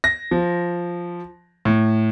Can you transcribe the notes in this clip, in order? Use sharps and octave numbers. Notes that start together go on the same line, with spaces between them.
A#6
F3
A2